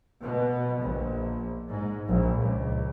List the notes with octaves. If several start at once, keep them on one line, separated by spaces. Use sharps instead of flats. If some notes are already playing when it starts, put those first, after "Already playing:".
B2
A#1
G#2
A#1
C#2